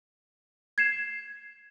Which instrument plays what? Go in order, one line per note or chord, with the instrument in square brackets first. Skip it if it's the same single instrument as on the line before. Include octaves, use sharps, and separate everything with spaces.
[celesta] G#6 C7 E7